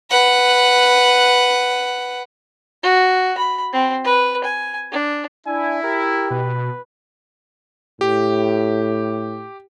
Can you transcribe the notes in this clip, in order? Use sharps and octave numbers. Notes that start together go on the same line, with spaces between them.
B4 F#5
F#4
B5
C4
B4
G#5
D4
D4 E4 G#5
G4 A#4
B2 B4
A2 G4